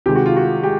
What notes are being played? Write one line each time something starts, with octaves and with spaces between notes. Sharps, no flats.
C3 D#3 G#3 G4
F#4
F4
F#4
G#3 G4